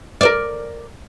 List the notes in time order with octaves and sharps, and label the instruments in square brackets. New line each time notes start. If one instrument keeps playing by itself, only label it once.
[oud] A#4 C5 D5